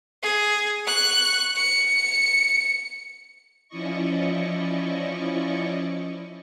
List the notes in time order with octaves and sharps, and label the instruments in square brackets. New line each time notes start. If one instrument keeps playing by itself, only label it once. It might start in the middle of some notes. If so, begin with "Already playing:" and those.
[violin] G#4
C#6 F#6
C#7
[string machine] F3 C#4 E4 D5 D#5 C#6